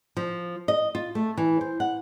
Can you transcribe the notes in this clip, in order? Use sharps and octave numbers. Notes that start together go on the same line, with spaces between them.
F3
D#5
F4
A3
E3
C5
F#5